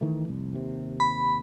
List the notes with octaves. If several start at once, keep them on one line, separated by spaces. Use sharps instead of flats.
D#3 E3 A3
F1 C2
D#2 C3
B5